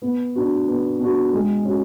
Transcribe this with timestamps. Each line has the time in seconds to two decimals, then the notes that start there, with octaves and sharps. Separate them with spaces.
0.02 B3
0.35 D4 F#4
0.68 B3
1.00 D4 F#4
1.33 G#3
1.65 C#4 F#4